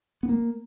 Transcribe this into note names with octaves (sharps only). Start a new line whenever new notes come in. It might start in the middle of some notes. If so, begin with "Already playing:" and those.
B3
A#3